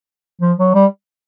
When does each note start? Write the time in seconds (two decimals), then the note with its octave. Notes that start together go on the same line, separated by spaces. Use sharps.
0.41 F3
0.59 F#3
0.75 G3